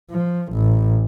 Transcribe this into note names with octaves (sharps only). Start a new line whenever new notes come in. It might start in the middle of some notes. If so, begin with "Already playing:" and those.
F3
A1